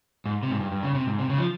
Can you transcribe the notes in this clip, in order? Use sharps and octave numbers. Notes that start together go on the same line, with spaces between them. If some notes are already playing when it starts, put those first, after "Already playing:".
G#2
C3
G#2
G2
G2
C#3
C3
G#2
C3
C#3
F3